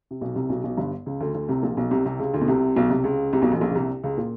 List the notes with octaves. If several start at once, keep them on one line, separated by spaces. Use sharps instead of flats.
C3
B1 B2
C2 C3
B1 B2
B1 B2
G1 G2
C#2 C#3
D2 D3
D2 D3
C2 C3
A#1 A#2
B1 B2
C2 C3
C2 C3
C#2 C#3
D2 D3
B2
C2 C3
B1 B2
C2 C3
C#2 C#3
C2 C3
B1 B2
A1 A2
B2
A#1 A#2
C#3
C2 C3
C#2 C#3
A#2